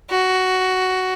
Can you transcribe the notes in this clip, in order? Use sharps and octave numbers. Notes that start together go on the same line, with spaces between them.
F#4